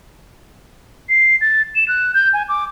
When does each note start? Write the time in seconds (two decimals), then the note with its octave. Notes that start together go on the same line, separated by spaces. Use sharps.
1.09 C7
1.41 A6
1.76 E7
1.88 F#6
2.14 G6
2.33 G#5
2.49 D6